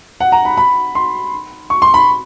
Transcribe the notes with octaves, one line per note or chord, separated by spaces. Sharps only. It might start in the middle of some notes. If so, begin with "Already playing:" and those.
F#5
A#5
B5
B5
C6
C#6
C6
B5